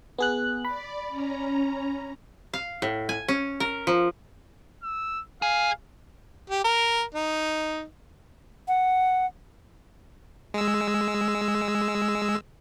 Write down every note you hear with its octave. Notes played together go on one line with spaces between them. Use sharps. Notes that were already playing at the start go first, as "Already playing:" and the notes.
B3 G#4 F#6
D5 B5
C#4 A#5
F5
A2
G#5
C#4
A#4
F3
E6
G#4 F5
G4
A#4
D#4
F#5
G#3 E6